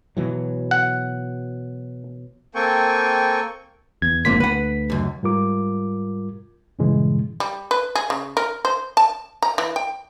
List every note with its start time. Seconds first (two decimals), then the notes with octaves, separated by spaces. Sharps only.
0.17 B2 E3 F#3
0.71 F#5
2.55 A#3 C4 A4 G5 G#5 C#6
4.02 E2 G#6
4.25 F#1 G#2 D3 F3 A#3 C4 B6
4.40 D2 B4 F#5
4.90 C#2 F#2
5.23 G#2 G3 F4 A#4 D6
6.79 G2 A#2 C#3 E3 G#3
7.40 G3
7.71 B4
7.95 G#4
8.10 C#3
8.37 A#4
8.65 C5
8.97 A5
9.42 A#5
9.58 E3
9.76 G5